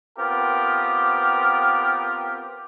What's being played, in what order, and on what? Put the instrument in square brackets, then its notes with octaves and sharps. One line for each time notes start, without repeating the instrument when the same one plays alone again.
[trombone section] B3 C4 F4 G4 A#4